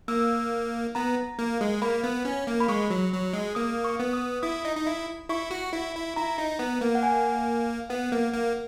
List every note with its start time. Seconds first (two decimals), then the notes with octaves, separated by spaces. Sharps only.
0.08 A#3 E6
0.95 B3 A#5
1.39 A#3
1.61 G#3
1.82 A#3 B5
2.04 B3
2.25 C#4
2.47 A#3
2.60 B5
2.68 G#3 C#6
2.90 F#3
3.13 F#3
3.33 G#3
3.55 A#3 D#6
3.85 C#6
3.99 B3
4.13 D#6
4.43 E4 D#6
4.65 D#4
4.77 D#4
4.87 E4
5.29 E4 C#6
5.51 F#4
5.73 E4
5.95 E4
6.16 E4 A#5
6.38 D#4
6.59 B3
6.81 A#3
6.95 F#5
7.03 G#5
7.90 B3 F#5
8.12 A#3
8.33 A#3